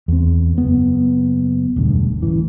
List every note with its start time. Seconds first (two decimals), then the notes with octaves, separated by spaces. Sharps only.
0.08 E2 C4
0.58 F#1 B3
1.76 E1 D2 G2
2.22 A1 E3